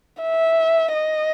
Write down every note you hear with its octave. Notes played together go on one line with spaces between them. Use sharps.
E5
D#5